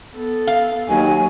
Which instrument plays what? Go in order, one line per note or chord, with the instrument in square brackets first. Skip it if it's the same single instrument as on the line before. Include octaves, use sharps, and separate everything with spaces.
[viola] B3 A4
[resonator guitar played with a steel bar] F5
[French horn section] D#2 [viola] F#3 [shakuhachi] G#5